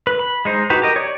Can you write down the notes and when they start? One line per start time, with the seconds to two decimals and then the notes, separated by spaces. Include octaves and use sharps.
0.07 B4
0.19 B5
0.45 G#3 D#4 C5
0.70 D#4 F#4 G4 B4
0.82 G4 A#4 D#5
0.96 C#5 D5